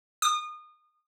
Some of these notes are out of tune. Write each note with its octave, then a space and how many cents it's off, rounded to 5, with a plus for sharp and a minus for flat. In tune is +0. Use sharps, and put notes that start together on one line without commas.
D#6 -30